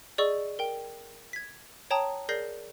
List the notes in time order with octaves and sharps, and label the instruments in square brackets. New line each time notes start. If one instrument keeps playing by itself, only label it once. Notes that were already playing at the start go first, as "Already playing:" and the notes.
[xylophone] G#4 D5 D#5 C#6 E6
A#4 G5
G#6 B6
C#5 G5 A5 A#5 D#6
G#4 A#4 D5 G6 A#6 C7